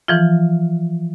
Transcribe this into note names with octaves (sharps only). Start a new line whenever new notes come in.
E3 F3 F4